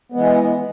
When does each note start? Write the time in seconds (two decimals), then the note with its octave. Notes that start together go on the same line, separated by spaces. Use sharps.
0.12 E3 G#3 B3